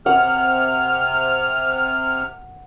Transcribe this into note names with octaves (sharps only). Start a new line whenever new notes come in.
C3 F#5 F6